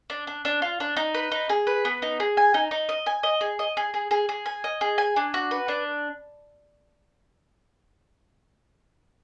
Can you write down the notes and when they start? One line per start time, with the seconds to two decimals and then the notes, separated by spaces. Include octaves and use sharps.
0.10 D4
0.27 D4
0.45 D4
0.62 F4
0.80 D4
0.97 D#4
1.14 B4
1.32 D#4
1.49 G#4
1.67 B4
1.85 B3
2.02 D#4
2.20 G#4
2.37 G#5
2.54 D#4
2.71 D#4
2.89 D#5
3.06 G#5
3.23 D#5
3.41 G#4
3.59 D#5
3.77 G#4
3.94 G#4
4.11 G#4
4.29 G#4
4.46 G#5
4.64 D#5
4.81 G#4
4.98 G#5
5.16 D4
5.34 F#4
5.51 B4
5.68 D4